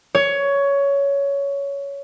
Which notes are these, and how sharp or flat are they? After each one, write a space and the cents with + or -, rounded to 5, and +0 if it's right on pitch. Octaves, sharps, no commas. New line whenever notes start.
C#5 +15